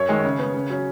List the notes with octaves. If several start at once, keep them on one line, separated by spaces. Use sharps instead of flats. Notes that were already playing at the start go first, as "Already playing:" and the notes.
Already playing: F#2 C#5
D#3 G#3
C#3
B3
C#3
F#3 C#4